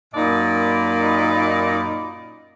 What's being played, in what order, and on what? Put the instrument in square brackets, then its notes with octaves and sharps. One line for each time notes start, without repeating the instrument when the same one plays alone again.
[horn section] F#2 A#2 D#4 D5 D#5 B5